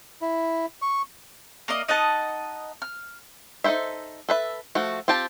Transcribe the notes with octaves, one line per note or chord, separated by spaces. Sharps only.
E4
C#6
A#3 A#4 D5 D#5
D#4 D#5 F#5 A5
F6
D#4 A4 A#4 C5 E5
A4 B4 E5
F3 A3 F#4
C4 F4 G4 A5